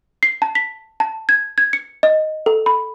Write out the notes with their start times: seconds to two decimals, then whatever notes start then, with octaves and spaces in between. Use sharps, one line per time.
0.23 C7
0.42 A5
0.55 B6
1.00 A5
1.29 G#6
1.58 G#6
1.73 C#7
2.03 D#5
2.46 A4
2.66 B5